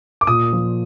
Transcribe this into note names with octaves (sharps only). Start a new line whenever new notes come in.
D6
A#2 D#6
F3